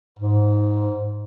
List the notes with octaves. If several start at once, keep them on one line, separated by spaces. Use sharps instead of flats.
G#2